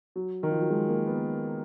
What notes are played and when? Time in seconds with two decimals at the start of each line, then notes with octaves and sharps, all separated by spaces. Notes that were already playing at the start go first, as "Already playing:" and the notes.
0.16 F#3
0.43 D#3
0.51 F3
0.61 F#3
0.70 G#3
0.89 A#3
1.06 B3